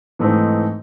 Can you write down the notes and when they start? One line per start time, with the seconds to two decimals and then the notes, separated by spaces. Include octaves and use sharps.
0.19 G#2 E3 A3 C4 D#4